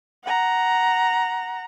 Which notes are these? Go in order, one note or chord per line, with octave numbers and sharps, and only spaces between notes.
F#5 A#5